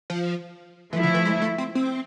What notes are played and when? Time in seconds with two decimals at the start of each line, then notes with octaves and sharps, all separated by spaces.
0.10 F3
0.92 E3 F3 A3 E4
1.03 D3
1.14 E3
1.25 G#3
1.42 A3
1.58 C4
1.75 C4